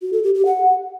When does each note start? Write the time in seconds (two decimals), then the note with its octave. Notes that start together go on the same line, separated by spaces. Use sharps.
0.02 F#4
0.13 A4
0.24 G4
0.35 G4
0.45 F#5